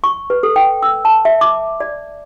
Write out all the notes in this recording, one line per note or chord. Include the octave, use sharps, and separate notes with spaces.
C#6
B4
A4
G5
E6
A5
E5
D6
D5